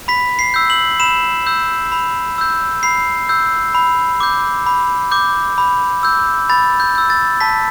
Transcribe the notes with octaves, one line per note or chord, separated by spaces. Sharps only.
B5 B6
C7
E6 G6
F#7
B5 E7
E6 G6
B5
E6 G6
B5 C7
E6 G6
B5
D6 G6
B5
D6 G6
B5
E6 G6
B5 A6
G6
E6 G6
A6
A5 B6